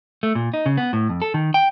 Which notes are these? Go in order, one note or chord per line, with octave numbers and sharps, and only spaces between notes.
A3
A#2
D#4
C#3
B3
A2
F2
A4
D#3
G5